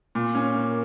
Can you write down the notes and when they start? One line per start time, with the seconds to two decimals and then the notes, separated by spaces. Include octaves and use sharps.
0.15 A#2
0.35 C#4
0.55 A#3